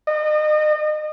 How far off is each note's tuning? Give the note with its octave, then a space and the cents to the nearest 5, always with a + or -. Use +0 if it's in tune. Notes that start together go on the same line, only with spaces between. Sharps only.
D#5 -35